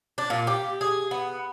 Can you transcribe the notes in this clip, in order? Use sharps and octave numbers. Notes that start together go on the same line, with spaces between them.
D4
A#2
G4
G#4
B3